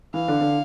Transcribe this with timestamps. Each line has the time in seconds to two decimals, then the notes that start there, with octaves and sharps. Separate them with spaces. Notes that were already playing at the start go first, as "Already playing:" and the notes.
0.14 E3 F5
0.28 D3
0.41 D3